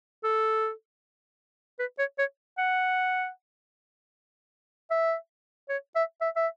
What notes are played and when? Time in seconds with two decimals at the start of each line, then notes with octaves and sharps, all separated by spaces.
0.24 A4
1.79 B4
1.99 C#5
2.18 C#5
2.58 F#5
4.91 E5
5.69 C#5
5.95 E5
6.21 E5
6.36 E5